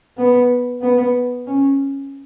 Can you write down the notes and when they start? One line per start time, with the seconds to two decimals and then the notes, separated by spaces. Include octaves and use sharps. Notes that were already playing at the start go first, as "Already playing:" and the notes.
0.18 B3
0.82 B3
1.47 C#4